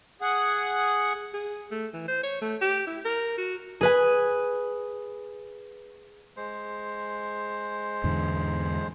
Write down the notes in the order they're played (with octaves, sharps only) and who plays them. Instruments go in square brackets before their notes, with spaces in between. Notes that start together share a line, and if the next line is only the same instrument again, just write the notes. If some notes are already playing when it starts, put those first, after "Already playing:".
[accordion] G#4 F#5
[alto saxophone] G#4
A3
E3
C5
C#5
A3
G4
E4
A#4
F#4
[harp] G#4 B4 G#5
[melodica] G#3 C5
[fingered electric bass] E2 G#2 D3